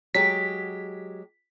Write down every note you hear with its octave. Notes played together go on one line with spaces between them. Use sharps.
F#3 G#3 G4 B6